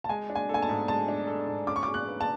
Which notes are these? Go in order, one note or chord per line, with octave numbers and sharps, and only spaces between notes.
A5
G#3 G#5
D4
G#5
A4 G#5
A5
G#2
G#3 A5
D4
A4
G#2
C#4 D6
C#6
D6
G#4
F#6
B4
A5